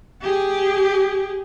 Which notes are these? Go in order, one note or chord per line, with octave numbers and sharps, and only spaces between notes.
G4 G#4